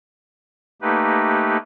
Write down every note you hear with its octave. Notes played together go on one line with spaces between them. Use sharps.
A3 A#3 D#4 G4 B4